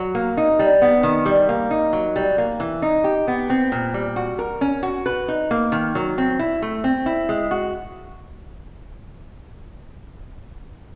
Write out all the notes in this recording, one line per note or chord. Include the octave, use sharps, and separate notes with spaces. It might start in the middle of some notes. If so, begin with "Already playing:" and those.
Already playing: F#3
A#3
D#4
G3
B3
D#3
G3
A#3
D#4
F#3
G3
A#3
E3
D#4
G4
B3
C4
A#2
G3
F#4
A#4
C#4
F#4
B4
D#4
A#3
D#3
F#3
C4
E4
A3
C4
E4
G#3
F#4